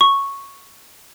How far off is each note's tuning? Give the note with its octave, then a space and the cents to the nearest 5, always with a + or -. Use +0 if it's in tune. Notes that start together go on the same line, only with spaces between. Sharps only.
C#6 -5